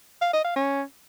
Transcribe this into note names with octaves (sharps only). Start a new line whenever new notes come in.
F5
D#5
F5
C#4